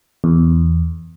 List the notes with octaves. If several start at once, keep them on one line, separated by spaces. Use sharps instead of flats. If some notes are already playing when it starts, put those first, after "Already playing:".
E2